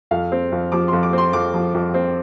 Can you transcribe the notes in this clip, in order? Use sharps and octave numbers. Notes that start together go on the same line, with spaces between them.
F2 F5
C4
F2
F3 D6
F2 C6
D6
C4 C6
F2 D6
F3
F2
C4